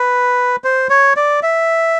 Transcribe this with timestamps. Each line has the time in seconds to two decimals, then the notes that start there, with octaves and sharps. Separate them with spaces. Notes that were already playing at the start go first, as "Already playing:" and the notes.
Already playing: B4
0.64 C5
0.90 C#5
1.16 D5
1.43 E5